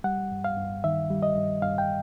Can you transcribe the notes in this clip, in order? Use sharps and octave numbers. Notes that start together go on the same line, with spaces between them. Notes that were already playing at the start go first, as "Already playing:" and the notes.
G3 F#5
G2
F5
G2
D#3 E5
G3
D#5
G2
G2 F5
G5